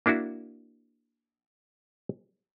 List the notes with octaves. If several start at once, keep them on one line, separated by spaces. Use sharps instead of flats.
A#3 D4 E4 F#4